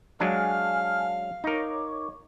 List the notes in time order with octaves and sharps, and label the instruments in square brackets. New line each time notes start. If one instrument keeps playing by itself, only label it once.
[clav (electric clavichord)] F#3 G#3 D4 [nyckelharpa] F5 [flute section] G#5 A5 F6
[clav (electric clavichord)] D#4 A#4 [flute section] C#5 C#6 D6